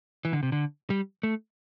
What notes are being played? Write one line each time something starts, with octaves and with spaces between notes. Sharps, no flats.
E3
D3
C3
D3
G3
A3